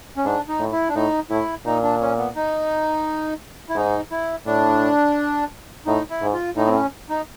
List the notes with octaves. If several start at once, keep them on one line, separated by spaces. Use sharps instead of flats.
C#4
G#2 D4
D#4
A2
E4
D4
A2 D#4
A2 E4
A#2 D#4
D4
C#4
B3
D#4
E4
G#2 D#4
E4
A2 D4
A2 D#4
E4
G#2
F4
A2 D#4
C4
C#4
D#4